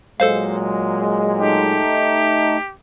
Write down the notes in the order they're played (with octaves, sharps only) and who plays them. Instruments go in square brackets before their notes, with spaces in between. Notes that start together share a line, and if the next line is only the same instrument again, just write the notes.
[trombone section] A#2 F#3 G#3 [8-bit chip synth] A4 C5 F5
[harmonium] A3 D#4 [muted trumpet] G4